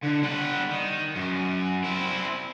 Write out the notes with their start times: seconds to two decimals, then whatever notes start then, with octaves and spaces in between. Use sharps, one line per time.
0.04 D3
0.23 G3 F#5
0.71 D#3
1.15 F#2
1.84 C4 E4